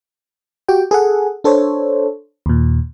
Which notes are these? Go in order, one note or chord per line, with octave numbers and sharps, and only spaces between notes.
F#4 G4 G5
G#4 A4 F#5
D4 A4 C5 C#5
D#2 A#2